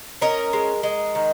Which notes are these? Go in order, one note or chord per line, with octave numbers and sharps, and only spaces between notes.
C#4 A#4 D#5
G#3
G#3
D#3